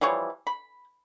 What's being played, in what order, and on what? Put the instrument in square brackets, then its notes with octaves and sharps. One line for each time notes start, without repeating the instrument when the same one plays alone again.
[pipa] E3 F3 G3 C#5
B5